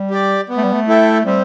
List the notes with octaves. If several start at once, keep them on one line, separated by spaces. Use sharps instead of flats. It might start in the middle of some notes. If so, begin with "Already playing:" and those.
Already playing: G3
G4 D5
B3
A3
G3
A3
E4 A4 E5 G5
G3 C4